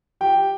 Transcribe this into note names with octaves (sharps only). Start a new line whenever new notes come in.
F3 G4 G5